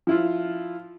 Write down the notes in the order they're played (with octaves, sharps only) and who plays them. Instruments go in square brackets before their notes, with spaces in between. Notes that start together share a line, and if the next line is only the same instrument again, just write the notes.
[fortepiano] F3 E4 F4